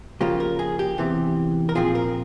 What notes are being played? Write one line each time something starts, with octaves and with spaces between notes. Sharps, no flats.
C#3 F3 A#3 F4 G4
A#4
G#4
G4
E2 C3 E3
A#4
A#2 F3 C4 F4 G#4
A#4